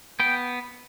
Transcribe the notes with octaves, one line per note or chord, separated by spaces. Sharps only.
B3 G5